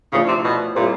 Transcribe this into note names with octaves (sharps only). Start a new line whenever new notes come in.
A2 C#3 F3 A3 D4
C3
B2
A#2 G3 C4 E4 G#4 C5